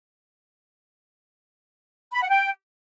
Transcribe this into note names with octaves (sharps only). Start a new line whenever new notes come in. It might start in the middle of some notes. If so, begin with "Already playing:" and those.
B5
F#5
G5